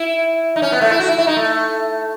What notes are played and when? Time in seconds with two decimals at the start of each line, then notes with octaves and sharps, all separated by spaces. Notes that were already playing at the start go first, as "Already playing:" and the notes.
Already playing: E4
0.56 D#4
0.62 C#4
0.72 B3
0.81 A3
0.91 E4
0.99 F#4
1.08 E4
1.18 E4
1.27 D#4
1.36 A3